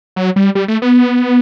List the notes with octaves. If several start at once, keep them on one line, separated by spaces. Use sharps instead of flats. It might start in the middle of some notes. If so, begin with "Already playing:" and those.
F#3
G3
G3
A3
B3